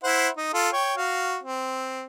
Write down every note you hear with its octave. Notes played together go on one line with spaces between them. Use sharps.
E4 C5 F#5
D#4
F4 A4
C#5 G5
F#4 F5
C4